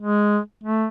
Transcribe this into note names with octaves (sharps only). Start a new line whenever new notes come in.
G#3
A3